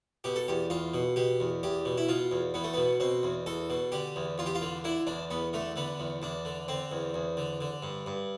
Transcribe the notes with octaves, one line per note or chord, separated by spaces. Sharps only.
B2 G4
A4
E2 G4
E2 F4
B2
B2 G4
E2
E2 G4
B2
E4
B2 F4
E2
E2 B3
A3
B2 B3
B2 C4
E2
E2 A4
B2
D3 G4
E2
E2 F4
G4
F4
D3
D3 E4
E2 D4
E2 B3
D3 A3
D3 B3
E2
E2 D4
D3
D3 C4
E2
E2
D3
D3
G2
G2